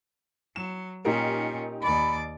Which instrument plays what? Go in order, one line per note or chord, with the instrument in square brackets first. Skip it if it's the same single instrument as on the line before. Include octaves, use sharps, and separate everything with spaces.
[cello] F#3 [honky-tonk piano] E7
[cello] A#2 C#4 [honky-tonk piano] D#4 G4 A#4
[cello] D#2 D5 [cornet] B5